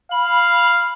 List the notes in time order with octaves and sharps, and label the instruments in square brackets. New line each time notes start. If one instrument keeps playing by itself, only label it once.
[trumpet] F5 [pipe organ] B5